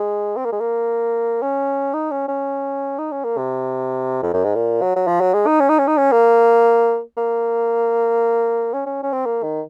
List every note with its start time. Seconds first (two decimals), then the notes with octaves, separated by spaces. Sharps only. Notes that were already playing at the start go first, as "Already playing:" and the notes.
Already playing: G#3
0.37 C4
0.45 A#3
0.52 G#3
0.60 A#3
1.42 C#4
1.94 D#4
2.11 C#4
2.28 C#4
2.98 D#4
3.11 C#4
3.24 A#3
3.37 C3
4.22 F2
4.34 F#2
4.44 G#2
4.55 A#2
4.81 F#3
4.96 F#3
5.07 F3
5.21 F#3
5.33 G#3
5.47 D#4
5.60 C#4
5.69 D#4
5.78 C#4
5.87 D#4
5.97 C#4
6.12 A#3
7.17 A#3
8.73 C#4
8.86 C#4
9.03 C#4
9.13 C4
9.26 A#3
9.43 D#3